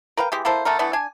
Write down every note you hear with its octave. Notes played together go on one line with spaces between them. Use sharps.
A#4 B4 F5 G5
E3 G#3 G4
A#3 E4 A4 C5
D3 A3 A#4
E3 A3 B3 D4
D4 G#5